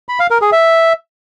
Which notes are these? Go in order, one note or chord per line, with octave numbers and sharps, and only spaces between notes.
B5
F5
A#4
G#4
E5